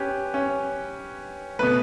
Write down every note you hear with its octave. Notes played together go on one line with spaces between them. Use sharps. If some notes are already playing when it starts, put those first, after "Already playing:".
Already playing: C#4 G4 B4
C#4
B2 A3 B4